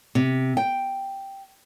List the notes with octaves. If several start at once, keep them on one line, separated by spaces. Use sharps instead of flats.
C3
G5